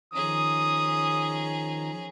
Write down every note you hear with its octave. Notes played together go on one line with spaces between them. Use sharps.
D#3 F3 C#4 G#4 A#5 D#6